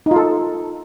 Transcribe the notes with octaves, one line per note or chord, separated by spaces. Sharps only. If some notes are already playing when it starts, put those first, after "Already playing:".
D#4
F4
A4